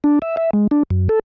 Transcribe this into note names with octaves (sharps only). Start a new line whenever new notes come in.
D4
E5
E5
G#3
D4
F#2
A4